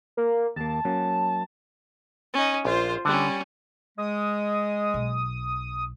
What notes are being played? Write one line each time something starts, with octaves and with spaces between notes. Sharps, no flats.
A#3
D#2 A#3 A5
F#3 A#3 C#4
C#4 D#4
A#1 F4 C5
D3 G3 C#4
G#3 D#6
B1